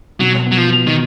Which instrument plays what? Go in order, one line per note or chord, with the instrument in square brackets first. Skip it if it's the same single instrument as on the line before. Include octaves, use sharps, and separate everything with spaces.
[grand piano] B2 [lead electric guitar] F#3
[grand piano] B3
[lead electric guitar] F#3
F3
[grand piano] B3
[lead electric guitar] D#3